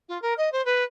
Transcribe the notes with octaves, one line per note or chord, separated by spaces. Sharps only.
F4
A#4
D#5
C5
B4